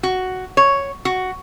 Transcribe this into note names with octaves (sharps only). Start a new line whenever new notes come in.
F#4
C#5
F#4